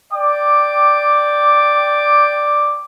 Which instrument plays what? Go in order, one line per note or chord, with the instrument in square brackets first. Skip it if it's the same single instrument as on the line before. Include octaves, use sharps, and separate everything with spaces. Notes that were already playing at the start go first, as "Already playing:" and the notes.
[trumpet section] D5 G5 D6